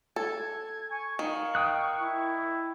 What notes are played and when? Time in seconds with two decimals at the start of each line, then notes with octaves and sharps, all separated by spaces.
0.16 A4 G#6
0.91 G#5 C#6
1.19 D#3 F5 C#6
1.55 G5 D#6 F#6
2.00 E4